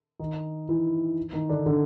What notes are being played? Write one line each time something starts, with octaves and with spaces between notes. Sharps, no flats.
D#3 D#4
E3 E4
D#3 D#4
D3 D4
D3 D4